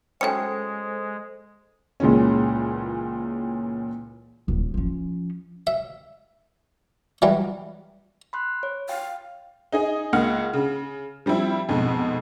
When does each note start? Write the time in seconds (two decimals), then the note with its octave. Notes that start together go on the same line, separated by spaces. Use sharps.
0.21 F#3 G#3 A3 C#4 A4 C5 G5 C#7
2.00 C#2 A#2 E3 G#3 C#4
4.48 D#1
4.74 F3 C#4
5.67 E5
7.22 E3 F#3 G3
8.33 B5 C6 F#6
8.63 C#5
8.89 F5 G5
9.72 D#4 G#4 D#5
10.13 C#2 A#3 F#5 F6
10.53 C#3
11.26 F3 G3 C4 E4
11.69 F2 G#2 B2